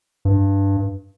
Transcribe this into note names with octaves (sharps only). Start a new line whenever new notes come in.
G2